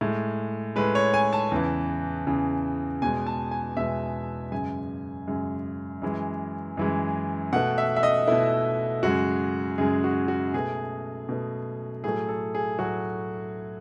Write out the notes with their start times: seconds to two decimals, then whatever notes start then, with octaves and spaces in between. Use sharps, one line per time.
0.01 A2 G#3
0.76 A2 G#3 B4
0.95 C#5
1.14 G#5
1.33 A5
1.52 E2 C#3 E3
2.27 E2 C#3 E3
3.02 E2 B2 G#3 G#5
3.27 A5
3.51 G#5
3.77 E2 B2 G#3 E5
4.52 F#2 C#3 G#3 G#5
5.27 F#2 C#3 G#3
6.02 F#2 E3 G#3
6.77 F#2 E3 G#3
7.53 B2 A3 F#5
7.78 E5
7.96 E5
8.03 D#5
8.28 B2 A3 E4
9.03 F#2 C#3 G#3 F#4
9.78 F#2 C#3 G#3 G#4
10.04 F#4
10.28 F#4
10.53 B2 A3 G#4
11.29 B2 A3
12.04 A2 F#3 A3 G#4
12.28 A4
12.55 G#4
12.79 A2 F#3 A3 F#4